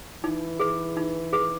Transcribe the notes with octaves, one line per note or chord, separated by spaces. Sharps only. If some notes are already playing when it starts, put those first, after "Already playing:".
E3 D#4
G#4 B4
D#4
G#4 B4